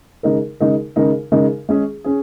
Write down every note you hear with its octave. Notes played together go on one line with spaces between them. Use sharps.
C#3 G#3 D#4 A#4
C#3 G#3 D#4 A#4
C#3 G#3 D#4 A#4
C#3 G#3 D#4 A#4
G#3 C#4 G#4
C#4 G#4